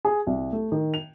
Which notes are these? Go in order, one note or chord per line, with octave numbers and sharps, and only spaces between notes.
G#4
C2
A3
D#3
F7